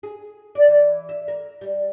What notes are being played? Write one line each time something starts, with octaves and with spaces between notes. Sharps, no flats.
G#4
D5
E3
E5
A#4
G3